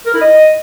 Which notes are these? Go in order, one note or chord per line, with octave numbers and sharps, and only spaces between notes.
A#4
E4
D#5